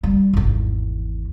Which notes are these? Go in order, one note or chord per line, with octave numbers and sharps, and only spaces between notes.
G3
G#1 E2